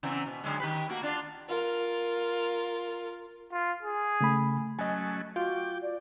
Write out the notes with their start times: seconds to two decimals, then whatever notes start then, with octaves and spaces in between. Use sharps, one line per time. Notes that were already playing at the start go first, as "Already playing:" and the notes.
0.03 C#3 E3 C4
0.26 B2
0.44 D3 F#3 G#3
0.60 D#3 G4 B4
0.89 A3 A#3 F#4
1.02 D4 F4
1.49 F4 A#4
3.52 F4
3.82 G#4
4.21 C#3 A3 B5
4.79 F#3 A3 C#4 D#5 G#5
5.36 F4 F#4 G5 D6
5.82 D5